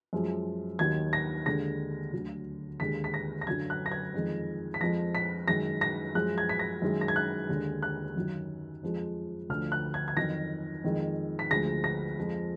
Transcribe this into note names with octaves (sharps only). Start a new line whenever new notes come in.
F#2 F3 G#3
D#2 D#3 F#3 G#6
A#6
D#2 D3 G#3 A#6
D2 D3 F#3
D#2 D3 G#3 B6
B6
A#6
A#6
F#2 D3 F#3 G#6
F#6
A#6
G#6
F2 D#3 G#3
B6
F2 F3 G#3 A#6
B6
F#2 D#3 G#3 A#6
A#6
F#2 F3 G#3 F#6
G#6
B6
A#6
F#2 D#3 G#3
A#6
G#6
F#6
D#2 D3 G#3
F#6
F#2 D#3 F#3
F2 F3 G#3
D2 D3 F3 F6
F#6
G#6
G#6
F2 D#3 F#3 A#6
F2 D#3 G#3
B6
D2 D3 F3 G#3 A#6
A#6
F2 F3 G#3